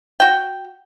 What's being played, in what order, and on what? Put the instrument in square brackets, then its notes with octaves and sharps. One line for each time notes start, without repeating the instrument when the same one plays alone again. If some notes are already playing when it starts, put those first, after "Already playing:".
[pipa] F#4 G5